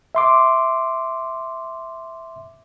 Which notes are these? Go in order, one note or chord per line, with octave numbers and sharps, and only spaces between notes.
E5 C6 D6